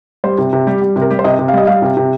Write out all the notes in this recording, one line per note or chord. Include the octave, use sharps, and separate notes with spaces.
G3 C5
C3
C3
G3 G4
G3
C3
A#4
G3 G4
C5
C3 D#5
C3
F5
G3 D#5
G3 F5
C3
C3